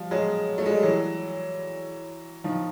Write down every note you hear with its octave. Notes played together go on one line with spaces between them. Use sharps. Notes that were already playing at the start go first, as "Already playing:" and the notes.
Already playing: F3 G3
F#3 G#3
A3
G#3
G3
E3 F#3
D#3 F3